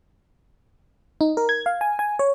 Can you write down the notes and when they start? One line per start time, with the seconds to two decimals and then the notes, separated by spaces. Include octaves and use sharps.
1.21 D#4
1.37 A#4
1.49 G#6
1.66 F5
1.81 G#5
1.99 G#5
2.19 C#5